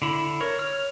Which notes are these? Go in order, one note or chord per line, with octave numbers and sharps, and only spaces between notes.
D3 E4
A#4 C#5
C#5 F6